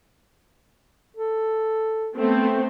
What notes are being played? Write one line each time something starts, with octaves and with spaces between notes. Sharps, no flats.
A4
A3 B3 C4